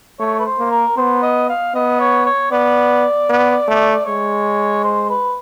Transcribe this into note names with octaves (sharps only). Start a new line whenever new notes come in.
A3 C#5
B4
C5
A#3
A#4
B3 C5
D#5
F5
B3 D#5
C#5
C#5
B3 D5
B3
A3
G#3 C#5
C5
B4